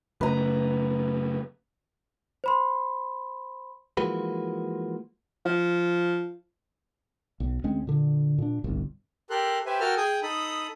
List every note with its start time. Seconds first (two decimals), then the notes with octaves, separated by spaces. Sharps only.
0.21 F#2 C#3 A3 B4 A#5
2.44 C5 B5 C6
3.97 E3 F3 G#3 A#3 F#4 B4
5.46 F3
7.40 B1
7.64 D2 G#3 C4 C#4
7.87 A#2 D3
8.38 A#2 D4
8.64 D1 G1 C2
9.30 G4 A4 A#4 C6 F#6
9.66 G4 B4 C5 E5 G#5
9.80 F#4 A4 A#4 G5 A5 F6
9.97 G#4 G5 G#5 D#6
10.23 D#4 A4 B5 D#6